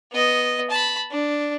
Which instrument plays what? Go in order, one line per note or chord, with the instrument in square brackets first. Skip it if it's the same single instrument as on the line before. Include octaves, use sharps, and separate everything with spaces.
[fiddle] B3 D#5
A5 B5
D4